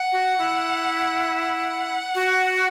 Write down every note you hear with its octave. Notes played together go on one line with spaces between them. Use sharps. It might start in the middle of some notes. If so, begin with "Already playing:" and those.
Already playing: F#5
F#4
E4
F#5
F#4